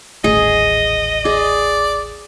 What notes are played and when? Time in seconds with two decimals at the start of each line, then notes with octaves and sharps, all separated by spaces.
0.24 D#1 A1 A3 G#4 D#5
1.25 G#4 D5